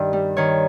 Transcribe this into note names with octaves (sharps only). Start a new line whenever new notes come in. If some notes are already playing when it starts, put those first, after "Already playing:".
Already playing: G2 D#3
G3
D#3 C#5